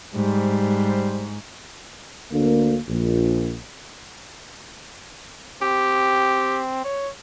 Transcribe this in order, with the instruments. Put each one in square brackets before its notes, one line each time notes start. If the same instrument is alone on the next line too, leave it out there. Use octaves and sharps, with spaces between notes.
[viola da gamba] G#2 [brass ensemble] G3 C5
[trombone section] D2 D3 A#3
A#1
[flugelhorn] C4 [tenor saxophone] G4
[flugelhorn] C#5